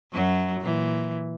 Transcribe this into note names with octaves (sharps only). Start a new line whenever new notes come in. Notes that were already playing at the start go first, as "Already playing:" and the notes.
F#2 F#3
A#2 E3